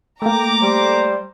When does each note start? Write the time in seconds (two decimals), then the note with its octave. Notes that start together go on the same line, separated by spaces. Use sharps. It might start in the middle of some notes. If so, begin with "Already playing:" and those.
0.22 A3 A#3 G5 A#5 D6
0.62 G3 C5